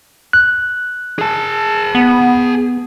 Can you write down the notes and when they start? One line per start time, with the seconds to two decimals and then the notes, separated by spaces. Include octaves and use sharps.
0.33 F#6
1.19 G#4 A5
1.95 B3